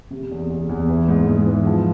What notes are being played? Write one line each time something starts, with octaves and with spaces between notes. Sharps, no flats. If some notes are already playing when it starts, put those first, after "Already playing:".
C3
E2
E2
E2
E3
G#2
G#2
E3
F3